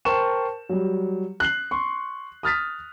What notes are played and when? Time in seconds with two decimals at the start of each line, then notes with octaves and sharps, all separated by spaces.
0.05 A#4 C5 G5 A5 C#6 E7
0.69 F#3 G3
1.40 F#6 C7 F#7
1.71 C6 C#6
2.43 D#6 F6 A6 B6